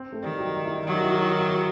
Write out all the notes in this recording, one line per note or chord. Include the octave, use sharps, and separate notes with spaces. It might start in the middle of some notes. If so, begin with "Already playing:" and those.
Already playing: C4
A3
D#3 G3
F#3
G3
E4
D#4
D#3 F#3 E4
F#4
E4
F#4
E4
F#4
E4
F#4